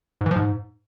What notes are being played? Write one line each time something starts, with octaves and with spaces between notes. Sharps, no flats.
G#2
E3
F3
G#2